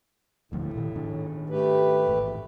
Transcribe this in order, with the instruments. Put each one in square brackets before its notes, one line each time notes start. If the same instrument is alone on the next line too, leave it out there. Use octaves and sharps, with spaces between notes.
[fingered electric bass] D#1 D2 F3 [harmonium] A2
[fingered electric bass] A#2 D#3
G#2 D#3 D4
[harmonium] A3 G4 B4
[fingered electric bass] A1 G#2